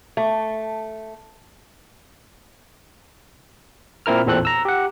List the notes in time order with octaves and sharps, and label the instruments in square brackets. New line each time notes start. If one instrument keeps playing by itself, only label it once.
[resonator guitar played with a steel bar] A3
[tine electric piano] A#2 C4 E4 A#4 F6
A1 E2 A#2 C4 A4 F#6
A#5 E6
G4 F#5